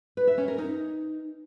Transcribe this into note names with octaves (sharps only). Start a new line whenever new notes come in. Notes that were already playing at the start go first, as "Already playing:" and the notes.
B4
E5
C#4
A#4
D#4